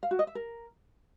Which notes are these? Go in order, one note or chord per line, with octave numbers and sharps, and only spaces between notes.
F5
F#4
D#5
E5
A#4